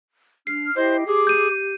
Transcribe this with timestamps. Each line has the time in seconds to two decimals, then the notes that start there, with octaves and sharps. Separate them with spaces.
0.47 D4 F6 C7
0.76 E4 G4 C5 D#5
1.07 G4 G#4 D6
1.27 G6 D#7